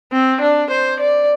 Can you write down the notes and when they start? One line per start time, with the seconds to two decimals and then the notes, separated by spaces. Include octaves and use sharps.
0.12 C4
0.41 D4
0.70 C5
1.00 D5